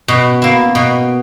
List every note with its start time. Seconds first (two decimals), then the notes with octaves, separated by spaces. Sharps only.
0.08 B2
0.42 A#3 E4
0.75 B2